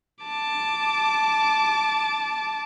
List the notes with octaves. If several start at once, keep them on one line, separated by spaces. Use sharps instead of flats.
A5 D6